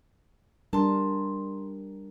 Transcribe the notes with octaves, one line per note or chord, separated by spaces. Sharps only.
G3 D4 A#4 A5 C6